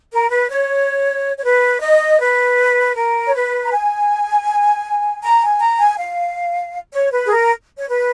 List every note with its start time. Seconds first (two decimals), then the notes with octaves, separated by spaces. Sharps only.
0.11 A#4
0.30 B4
0.49 C#5
1.36 C#5
1.43 B4
1.81 D#5
2.20 B4
2.95 A#4
3.27 C#5
3.33 B4
3.64 A#5
3.71 G#5
5.22 A#5
5.41 G#5
5.60 A#5
5.79 G#5
5.98 F5
6.92 C#5
7.11 B4
7.26 G#4
7.30 A#4
7.77 C#5
7.87 B4